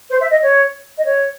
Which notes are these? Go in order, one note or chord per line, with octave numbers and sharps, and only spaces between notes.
C5
E5
D#5
C#5
D#5
C#5